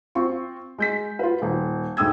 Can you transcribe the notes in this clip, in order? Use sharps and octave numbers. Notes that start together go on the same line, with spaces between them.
C4 F4 C#6
G#3 G6 B6
F4 B4
D#1
D2 G#2 G5 D#6 E6 G#6